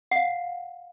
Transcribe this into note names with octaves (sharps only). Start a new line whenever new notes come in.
F5 F#5